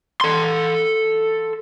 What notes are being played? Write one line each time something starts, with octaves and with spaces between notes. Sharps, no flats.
A4 C6